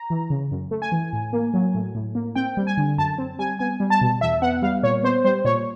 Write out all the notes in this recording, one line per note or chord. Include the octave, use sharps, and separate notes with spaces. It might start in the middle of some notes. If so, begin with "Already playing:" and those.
Already playing: A#5
E3
C#3
F#2
A3
G#5
E3
A2
A#3
F#3
A2
A2
A#3
C4 G5
G3
G#5
D3
F#2 A5
C4
G3 G#5
B3 G#5
G3
A5
B2
E2 E5
B3 F#5
G3 F5
A#2 C#5
B3 C5
G3 C5
A#2 C#5